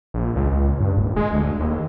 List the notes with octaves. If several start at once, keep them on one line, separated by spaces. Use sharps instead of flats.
A#1
C#2
G2
D#1
G#3
D2
D#2